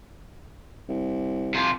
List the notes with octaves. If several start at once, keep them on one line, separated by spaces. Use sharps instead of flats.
C2
C3 F4